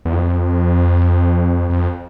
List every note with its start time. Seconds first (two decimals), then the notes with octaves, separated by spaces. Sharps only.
0.05 E2
0.13 F2
1.70 F2